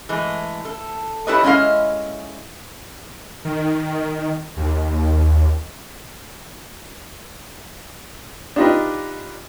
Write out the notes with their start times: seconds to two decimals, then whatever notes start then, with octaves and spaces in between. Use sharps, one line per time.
0.09 E3 G#3 A3
0.65 A4
1.27 E4 G4 A4 B4 C#5 D#5
1.43 G#3 C#4 E4 G4 D#5 F5
3.45 D#3
4.57 D#2
8.56 D4 D#4 F4 G4 B4 D#5